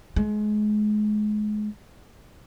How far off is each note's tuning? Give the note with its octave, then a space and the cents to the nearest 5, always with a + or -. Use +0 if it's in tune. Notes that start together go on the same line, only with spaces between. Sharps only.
G#3 +30